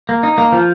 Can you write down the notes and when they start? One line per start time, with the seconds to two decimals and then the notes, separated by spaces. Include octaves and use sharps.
0.09 A#3
0.23 D#4
0.38 A#3
0.52 F3